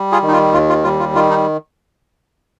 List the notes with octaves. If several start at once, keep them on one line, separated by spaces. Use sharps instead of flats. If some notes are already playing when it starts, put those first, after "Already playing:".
Already playing: G3
F4 G#4
D#3
D#4
F4
D#2 F4
F4
G3 F4
F4
D#3 F4
D#4